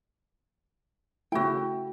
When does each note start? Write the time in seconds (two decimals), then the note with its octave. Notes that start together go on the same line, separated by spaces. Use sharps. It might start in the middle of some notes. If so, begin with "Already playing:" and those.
1.32 C#3 A3 E4 F#4 G5